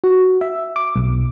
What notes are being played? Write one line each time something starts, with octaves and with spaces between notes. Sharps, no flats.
F#4
E5
D6
B1